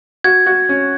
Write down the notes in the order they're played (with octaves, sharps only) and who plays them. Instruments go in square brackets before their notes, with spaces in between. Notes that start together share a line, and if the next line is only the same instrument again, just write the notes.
[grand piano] F#4 [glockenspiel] G#6
[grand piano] F#4
C#4